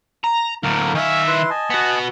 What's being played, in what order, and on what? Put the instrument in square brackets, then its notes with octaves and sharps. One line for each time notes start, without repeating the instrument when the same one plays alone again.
[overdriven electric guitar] A#5
[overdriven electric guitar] D2 A2 [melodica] A#3 F5
[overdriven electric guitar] D#3 E5 [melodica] F5 G#5 C#6
[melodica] E4 B4 C6
D#5 G#5 A5
[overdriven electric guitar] B3 F#4